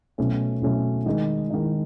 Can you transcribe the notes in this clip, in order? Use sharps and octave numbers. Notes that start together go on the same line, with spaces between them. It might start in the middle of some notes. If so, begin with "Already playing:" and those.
B2 F#3 A3 C#4
B2 F#3 A3 C#4
D#3 G#3 D#4
D#3 G#3 D#4